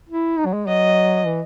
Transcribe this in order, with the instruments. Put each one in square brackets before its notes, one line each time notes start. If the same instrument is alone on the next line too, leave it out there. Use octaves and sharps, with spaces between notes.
[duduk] E4
D#4
F#3
G#3
[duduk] F#3 [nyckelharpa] D#5
[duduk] E3